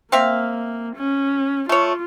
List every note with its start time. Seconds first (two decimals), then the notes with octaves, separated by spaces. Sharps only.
0.12 A#3 C4 E5 F5
0.96 C#4
1.69 A3 F4 C#5